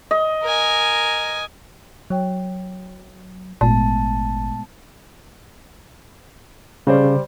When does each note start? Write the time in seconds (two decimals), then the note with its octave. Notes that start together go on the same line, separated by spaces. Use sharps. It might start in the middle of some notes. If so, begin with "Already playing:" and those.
0.11 D#5
0.44 A#4 G#5
2.10 F#3 C#5 G5
3.61 G#1 A#2 G#3 A3 B3 A5
6.87 C#3 G3 C5 D5